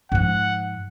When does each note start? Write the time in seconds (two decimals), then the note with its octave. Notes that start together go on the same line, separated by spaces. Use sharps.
0.12 G#2 F3 F#5